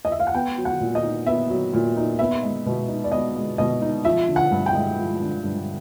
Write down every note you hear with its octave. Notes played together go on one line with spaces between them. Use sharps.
D#5
E5
F5
F#5
B3 G5
F#3
F#5
A#2
D#5
D#4
B3 E5
F#3
A#2
D#4
B3 E5
G#3
B2
D#4
D5
B3 D#5
G#3
B2 D#5
D#4
F3 E5
D3
F#5
G2
G5
G#3
F3
D3
G2